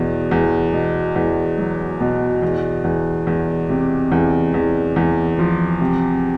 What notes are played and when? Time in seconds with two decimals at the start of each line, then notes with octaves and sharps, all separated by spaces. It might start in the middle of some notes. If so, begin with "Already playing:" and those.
Already playing: E2 B2
0.31 E2
0.73 B2
1.16 E2
1.58 F#3
2.00 B2
2.42 E2
2.84 E2
3.27 E2
3.69 C3
4.12 E2
4.54 E2
4.96 E2
5.39 F3
5.81 C3